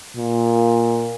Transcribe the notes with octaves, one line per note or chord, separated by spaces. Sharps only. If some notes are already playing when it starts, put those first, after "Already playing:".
A#2